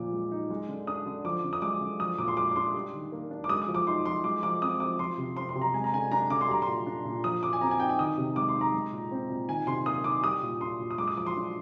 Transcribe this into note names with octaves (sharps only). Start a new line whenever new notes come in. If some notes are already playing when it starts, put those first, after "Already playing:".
Already playing: A#2 F3 D6
G#3
D#4
G#3
D3
D4 D#6
D3
F3 D6
D3
D#6
G#3 D6
D3
F3 D#6
A#2 D6
C6
G#3 D6
D6
D4 C6
G3
D#3
A#3
D4
D6
G#3 D#6
D#6
F3
D6
D#4 C6
F3 C6
G#3 D6
F3 D6
C4 D#6
F3 D6
F3 C6
C3
C4 C6
C6
C3
A#5
G#3 G#5
A#5
D3 G#5
D4 A#5
D3 D6
C6
G3 A#5
C6
A#2
D4
A#2
F3 D#6
D3 D6
G#5
C4 A#5
G#5
D#4 G5
G#5
D#3 D#6
C3
G#3 D6
C6
D#4
A#5
G#3
A#2
C4
A#2
D#3 G#5
C3 C6
A#3 D#6
D#4 D6
G3 D#6
A#2
D4 C6
A#2
D#6
G#3 D6
D#6
F3 D6
C6
D4